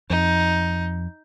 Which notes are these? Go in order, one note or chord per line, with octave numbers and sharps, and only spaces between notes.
F2 D#4